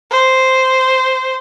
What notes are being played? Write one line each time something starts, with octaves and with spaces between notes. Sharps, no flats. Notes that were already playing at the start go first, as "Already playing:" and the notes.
C5